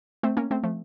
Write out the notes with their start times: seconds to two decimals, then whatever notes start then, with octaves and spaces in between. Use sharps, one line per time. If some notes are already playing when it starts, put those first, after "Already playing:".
0.23 A3 C4
0.37 A#3 C#4
0.51 A3 C4
0.63 F3 A3